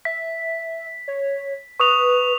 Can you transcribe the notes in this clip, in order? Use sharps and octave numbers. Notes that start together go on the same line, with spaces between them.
E5 B6
C#5
B4 C#6 D#6 F7